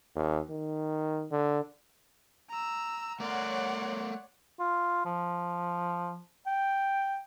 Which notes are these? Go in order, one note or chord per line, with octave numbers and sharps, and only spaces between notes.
D#2
D#3
D3
A#5 E6
A3 A#4 C#5 D5 F#5 C6
F4
F3
G5